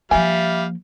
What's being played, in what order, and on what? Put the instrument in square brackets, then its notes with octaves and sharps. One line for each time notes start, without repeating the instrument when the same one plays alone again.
[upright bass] F3 A#3 [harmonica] G3 F5 [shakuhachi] E5 [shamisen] G#5